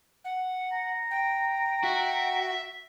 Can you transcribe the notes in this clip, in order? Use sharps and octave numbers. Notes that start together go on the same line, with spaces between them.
F#5
A#5
G5
F#4 E5